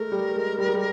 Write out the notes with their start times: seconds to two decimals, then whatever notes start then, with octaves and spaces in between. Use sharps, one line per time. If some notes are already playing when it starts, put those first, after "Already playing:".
Already playing: G#3 A3 A#4
0.12 G3
0.35 G#3
0.58 G3
0.67 G#3
0.74 G3